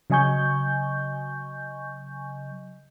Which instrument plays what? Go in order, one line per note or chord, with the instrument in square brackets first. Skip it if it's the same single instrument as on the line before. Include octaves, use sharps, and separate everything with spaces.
[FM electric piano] C#3 F#3 D#5 G#5 C#6 G6